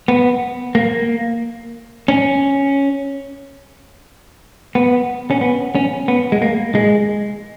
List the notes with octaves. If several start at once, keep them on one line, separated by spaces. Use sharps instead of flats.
B3
A#3
C#4
B3
C#4
B3
C#4
B3
G#3
A#3
G#3